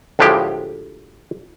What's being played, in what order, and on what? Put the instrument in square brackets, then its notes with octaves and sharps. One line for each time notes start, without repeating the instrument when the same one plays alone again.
[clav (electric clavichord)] D2 A2 F3 G#3 G4